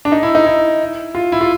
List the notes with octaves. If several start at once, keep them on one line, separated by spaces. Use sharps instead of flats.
D4
D#4
E4
D#4
E4
F4
E4
F4